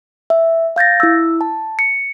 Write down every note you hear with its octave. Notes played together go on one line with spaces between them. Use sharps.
E5
F5 G6 A6 A#6
E4 E6
A5
C#7